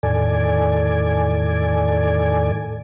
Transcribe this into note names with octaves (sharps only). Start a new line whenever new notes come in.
E2 A2 D#3 A4 D5 G#5